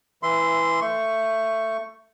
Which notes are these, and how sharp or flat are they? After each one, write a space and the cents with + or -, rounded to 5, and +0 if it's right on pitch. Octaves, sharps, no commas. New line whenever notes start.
E3 +0 E5 +10 C6 -15
A3 +20 C#6 +0